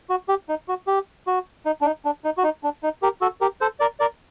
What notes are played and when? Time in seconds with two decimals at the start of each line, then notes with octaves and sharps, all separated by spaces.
0.10 F#4
0.29 G4
0.49 D#4
0.68 F#4
0.87 G4
1.27 F#4
1.66 D#4
1.81 D4
1.86 D#4
2.05 D4
2.24 D#4
2.38 F#4
2.44 D#4
2.64 D4
2.83 D#4
3.02 G4 A#4
3.21 F#4 A4
3.41 G4 A#4
3.61 A4 C5
3.80 A#4 D5
4.00 A#4 D5